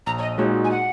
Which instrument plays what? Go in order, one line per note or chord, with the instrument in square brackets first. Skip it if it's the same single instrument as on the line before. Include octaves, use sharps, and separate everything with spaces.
[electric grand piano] A#1 [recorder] A#5
[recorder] C#5
D#5
[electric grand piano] A#2 G#3 D#4 F#4 [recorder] C#5
[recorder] G#5
F#5